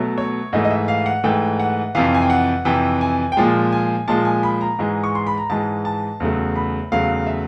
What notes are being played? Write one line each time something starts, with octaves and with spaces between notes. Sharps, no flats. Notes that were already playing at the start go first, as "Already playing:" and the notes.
Already playing: B2 F#3 A3
C#5
G#2 E3 A3 D#5
D#5
E5
F5
F#5
G#2 E3 A3 G5
F#5
F2 C3 E3 F5
G#5
G5
F#5
F2 C3 E3 G5
G#5
G5
A#2 F3 G#3 G#5
G#5
A#2 F3 G#3 A5
G#5
B5
A#5
G#2 E3 G#3
C#6
C6
B5
A#5
G#2 E3 G#3 A5
A5
E2 C#3 F#3 A3
B5
E2 C#3 F#3 A3 F5
E5